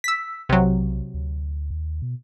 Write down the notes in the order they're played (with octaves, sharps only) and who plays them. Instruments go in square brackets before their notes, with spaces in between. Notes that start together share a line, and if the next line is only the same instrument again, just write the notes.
[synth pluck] E6 B6
[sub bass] B1 [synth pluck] C3 F#3
[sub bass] D2
D#2
B2